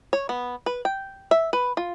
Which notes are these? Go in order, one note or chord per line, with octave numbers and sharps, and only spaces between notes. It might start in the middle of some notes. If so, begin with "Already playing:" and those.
C#5
B3
B4
G5
E5
B4
F4